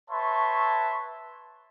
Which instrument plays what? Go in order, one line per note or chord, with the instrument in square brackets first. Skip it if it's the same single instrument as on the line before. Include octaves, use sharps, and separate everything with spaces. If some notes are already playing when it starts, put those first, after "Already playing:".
[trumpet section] B4 C#5 E5 A5 C6 C#6